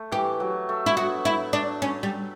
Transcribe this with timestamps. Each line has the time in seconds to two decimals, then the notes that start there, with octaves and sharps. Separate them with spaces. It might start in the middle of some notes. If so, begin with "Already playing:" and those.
Already playing: A3
0.12 E3 G4
0.40 F#3
0.69 A3
0.86 E4
0.97 B3 F#4
1.25 E4
1.53 D4
1.82 C#4
2.03 G3